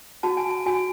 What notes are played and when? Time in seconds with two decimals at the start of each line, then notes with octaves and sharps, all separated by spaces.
0.23 F#4 A5
0.37 G#5
0.50 A5
0.66 F#4 G#5